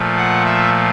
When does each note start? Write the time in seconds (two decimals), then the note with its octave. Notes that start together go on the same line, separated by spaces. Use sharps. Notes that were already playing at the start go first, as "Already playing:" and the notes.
Already playing: A#2 F3 A3
0.17 F#5
0.45 E5